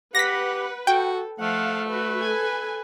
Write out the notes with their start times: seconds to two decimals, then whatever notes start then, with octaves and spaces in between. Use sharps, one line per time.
0.15 G4 B4 F#5 A#6 B6
0.87 F#4 A4 G5
1.40 F3 A3 F5 F#5 A5
1.90 F#4 B4
2.21 A4 G#5